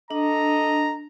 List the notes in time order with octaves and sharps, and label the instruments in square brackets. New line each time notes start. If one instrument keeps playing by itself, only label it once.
[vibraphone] D4 [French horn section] A4 D#5 [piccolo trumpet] A#5